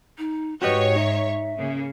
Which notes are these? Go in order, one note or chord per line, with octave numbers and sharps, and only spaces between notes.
D#4
G#2 F#4 G4 B4 C#5 D#5 C#6
D#4 E5
C#3 A#3